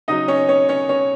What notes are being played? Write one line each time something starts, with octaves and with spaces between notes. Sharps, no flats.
C#3 F#3 D#4 D#5
C#4 C#5
C#4 C#5
C#4 C#5
C#4 C#5